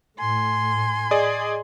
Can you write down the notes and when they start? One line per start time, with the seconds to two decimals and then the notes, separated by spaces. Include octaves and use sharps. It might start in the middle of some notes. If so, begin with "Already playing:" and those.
0.19 A2 G#5 C6
1.11 G#4 D5 D#5